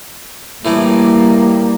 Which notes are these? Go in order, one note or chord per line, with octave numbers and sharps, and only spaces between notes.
A2 E3 G3 A3 A#3